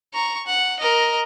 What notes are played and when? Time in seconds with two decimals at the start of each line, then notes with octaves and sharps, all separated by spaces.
0.14 A#5 C#6
0.47 F#5
0.79 A#4 D#5